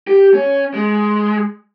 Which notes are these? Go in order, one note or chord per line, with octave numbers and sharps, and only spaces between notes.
G4
C#4
G#3